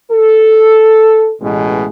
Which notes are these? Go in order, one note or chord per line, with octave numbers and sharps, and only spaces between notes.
A4
A1 B2 G#3